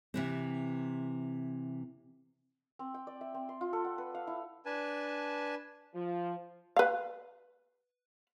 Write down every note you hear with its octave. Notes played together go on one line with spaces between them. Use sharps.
C3 E3 C4
C4
G5
D5
E5
C4
C6
F4
A4
F#5
B4
F5
E4
D4 B4 G#5 A5
F3
B4 F5